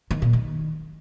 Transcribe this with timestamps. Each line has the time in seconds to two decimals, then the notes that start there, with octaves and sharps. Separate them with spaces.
0.11 D#3
0.22 A#2
0.33 D#3